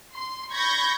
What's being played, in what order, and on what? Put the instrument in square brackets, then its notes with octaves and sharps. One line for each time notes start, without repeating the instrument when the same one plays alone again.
[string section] C6
B5 C#6 G6 G#6 A#6